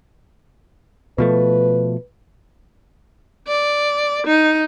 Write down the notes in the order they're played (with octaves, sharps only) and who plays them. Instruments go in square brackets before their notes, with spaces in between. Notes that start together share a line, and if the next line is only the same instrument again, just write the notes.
[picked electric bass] B2 F3 A3 [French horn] B4
[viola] D5
D#4